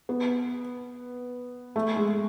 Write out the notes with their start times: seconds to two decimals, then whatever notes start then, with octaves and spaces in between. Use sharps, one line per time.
0.09 B3
1.76 A3
1.96 G#3